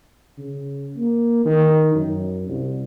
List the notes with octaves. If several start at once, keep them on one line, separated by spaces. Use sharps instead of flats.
C#3
A#3
D#3
F#2
C2